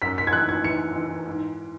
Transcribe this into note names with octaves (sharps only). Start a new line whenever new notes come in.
F#2 B6
B6
G#6
E3 F#6
G#6
E3 C#7
E3
G#2